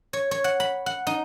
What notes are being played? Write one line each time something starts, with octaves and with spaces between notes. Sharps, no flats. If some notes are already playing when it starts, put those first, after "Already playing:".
C#5
C#5
F#5
B5
F#5
D#4